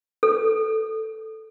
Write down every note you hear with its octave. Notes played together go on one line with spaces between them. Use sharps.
A4